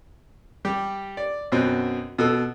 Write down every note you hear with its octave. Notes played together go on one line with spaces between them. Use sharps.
G3 G4
D5
F#2 B2 C4
B2 A4 E6